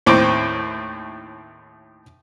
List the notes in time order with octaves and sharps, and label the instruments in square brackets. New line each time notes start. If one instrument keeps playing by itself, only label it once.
[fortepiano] D#2 A2 C4 D6